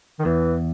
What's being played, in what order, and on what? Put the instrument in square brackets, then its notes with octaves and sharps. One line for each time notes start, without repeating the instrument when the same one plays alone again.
[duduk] D#3
[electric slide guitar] E2 [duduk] E3